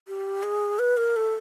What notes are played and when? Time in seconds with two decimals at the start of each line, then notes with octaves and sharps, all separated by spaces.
0.08 G4
0.43 G#4
0.79 B4
0.97 A#4
1.16 A4